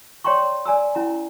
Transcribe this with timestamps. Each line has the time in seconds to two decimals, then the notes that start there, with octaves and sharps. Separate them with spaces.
0.24 C#5 D5 G5 A#5 C6 C#6
0.65 D5 G#5 A#5 E6
0.95 C#4 E4 A#5